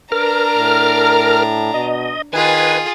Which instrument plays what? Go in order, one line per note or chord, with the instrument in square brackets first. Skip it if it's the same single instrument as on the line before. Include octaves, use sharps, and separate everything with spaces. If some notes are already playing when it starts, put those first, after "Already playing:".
[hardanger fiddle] D4 A#5 [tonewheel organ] A#4 F6 [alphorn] B4
[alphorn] A2
[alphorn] B2 [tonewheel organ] D#5
[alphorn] D#3 [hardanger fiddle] F4 G#4 [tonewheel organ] B4 G#5